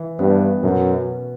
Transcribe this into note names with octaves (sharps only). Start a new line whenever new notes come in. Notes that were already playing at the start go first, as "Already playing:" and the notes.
Already playing: E3
G2 B3
F#2 B2